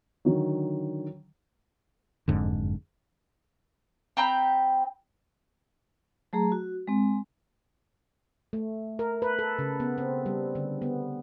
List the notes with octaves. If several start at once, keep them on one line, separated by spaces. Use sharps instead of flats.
D3 D#3 F#3
F#1 F2 G#2 D3
C4 G5 A#5 B5
F#3 A3 G#4 A#5
F#4
G#3 C4
A3
A#4
B4
A4
C#3
B3
C4
G3
D3
B3